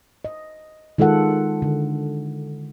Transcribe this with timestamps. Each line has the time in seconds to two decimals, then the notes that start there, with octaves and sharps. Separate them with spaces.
0.25 D#5
0.98 D#3 G#3 F4 A4 F#5
1.62 D3